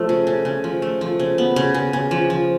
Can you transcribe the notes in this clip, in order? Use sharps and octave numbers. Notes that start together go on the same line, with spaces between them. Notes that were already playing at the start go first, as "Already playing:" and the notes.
Already playing: F3 A3
C#3
C#3
C#3
F3
A3
F3
C#3
B3
C#3
C#3
C#3
F3
F3